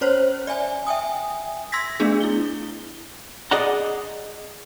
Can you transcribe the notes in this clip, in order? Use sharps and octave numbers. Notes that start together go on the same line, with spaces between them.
C#4 C5 C#5 F6
D5 E5 G#5
E5 G5 G#5 D#6
C6 E6 G#6 A#6 B6
A3 B3 D4 G#4
E4 G7
G#4 D5 D#5 F#5 A#5